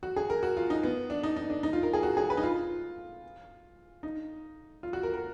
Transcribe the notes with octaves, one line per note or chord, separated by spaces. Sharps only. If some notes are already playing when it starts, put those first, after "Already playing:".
F#4
G#4
A#4
F#4
F4
D#4
B3
D4
D#4
D#4
D4
D#4
F4
A#4
G#4
F#4
G#4
B4
D#4
F4
D#4
F4
F#4
A#4
A#4